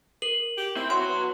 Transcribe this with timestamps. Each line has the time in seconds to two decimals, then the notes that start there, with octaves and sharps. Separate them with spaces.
0.22 A#4 F#7
0.58 G4
0.76 C4 E4
0.90 F#4 C#5 C6
1.08 B3